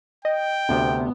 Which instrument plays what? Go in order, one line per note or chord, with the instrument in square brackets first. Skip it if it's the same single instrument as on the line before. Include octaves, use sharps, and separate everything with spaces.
[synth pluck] D#5 [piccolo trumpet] G5
[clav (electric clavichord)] D2 C3 [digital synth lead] B3